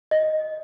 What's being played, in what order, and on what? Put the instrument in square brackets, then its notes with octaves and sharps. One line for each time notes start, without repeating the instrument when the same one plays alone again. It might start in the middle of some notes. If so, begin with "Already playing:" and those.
[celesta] D#5